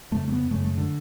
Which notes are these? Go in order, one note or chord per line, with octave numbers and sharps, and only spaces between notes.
F2 C#3 A3
A3
B3
F#2 C#3 A3
A3
D3